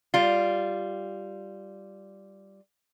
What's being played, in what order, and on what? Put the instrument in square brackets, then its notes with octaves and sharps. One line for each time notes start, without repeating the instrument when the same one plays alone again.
[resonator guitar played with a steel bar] G3 F4